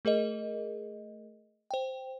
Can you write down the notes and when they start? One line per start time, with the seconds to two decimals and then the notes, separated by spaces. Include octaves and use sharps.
0.05 A3 G#4 A#4 D#5
1.71 C5 G5